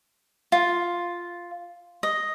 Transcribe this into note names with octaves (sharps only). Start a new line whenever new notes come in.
F4
D#5